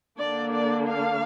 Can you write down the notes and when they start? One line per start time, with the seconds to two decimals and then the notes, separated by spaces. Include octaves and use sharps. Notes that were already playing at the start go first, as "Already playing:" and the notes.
0.18 D3 A#3 D4 D5
0.52 D5
0.87 F5